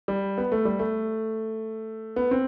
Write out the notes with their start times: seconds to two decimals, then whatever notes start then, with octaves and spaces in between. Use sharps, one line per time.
0.08 G3
0.38 B3
0.52 A3
0.65 G3
0.79 A3
2.16 B3
2.31 C4